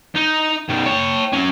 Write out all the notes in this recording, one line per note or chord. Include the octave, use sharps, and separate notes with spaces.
D#4
B2 D#3
C#5 G5
C#4 F#4